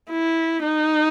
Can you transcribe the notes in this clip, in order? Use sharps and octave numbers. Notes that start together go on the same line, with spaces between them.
E4
D#4